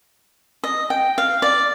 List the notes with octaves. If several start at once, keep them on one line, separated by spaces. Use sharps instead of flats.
D#5
G5
F5
D5